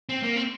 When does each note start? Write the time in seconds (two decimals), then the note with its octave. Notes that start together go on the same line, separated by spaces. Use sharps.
0.09 C4
0.23 A#3
0.36 C4